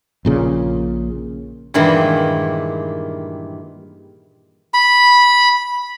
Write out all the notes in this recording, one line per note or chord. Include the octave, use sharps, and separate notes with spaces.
A#1 A#2 C#3
G2 A#2 D#3 E3 G#3 E4
B5